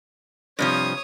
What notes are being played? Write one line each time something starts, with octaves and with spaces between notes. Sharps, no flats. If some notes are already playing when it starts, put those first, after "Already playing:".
G2 C3 F3 C#5 D#6